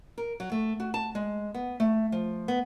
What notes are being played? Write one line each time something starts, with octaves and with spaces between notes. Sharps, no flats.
A#4
F#3
A3
F#4
A5
G#3
B3
A3
F3
B3